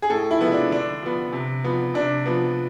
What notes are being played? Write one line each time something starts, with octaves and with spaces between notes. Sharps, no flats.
G#4
A2 A4
E4
F3 G#3 B3
D4
D3 D4
F3 B3
C3
F3 B3
C3 D4
F3 B3